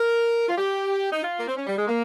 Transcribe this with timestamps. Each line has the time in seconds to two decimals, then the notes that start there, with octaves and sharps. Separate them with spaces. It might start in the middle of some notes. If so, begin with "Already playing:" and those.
Already playing: A#4
0.48 F4
0.58 G4
1.11 D#4
1.23 F4
1.39 A#3
1.48 C4
1.56 C#4
1.67 G3
1.77 G#3
1.88 A#3